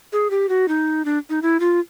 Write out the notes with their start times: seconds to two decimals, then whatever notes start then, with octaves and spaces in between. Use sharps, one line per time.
0.13 G#4
0.30 G4
0.49 F#4
0.68 D#4
1.05 D4
1.30 D#4
1.42 E4
1.60 F4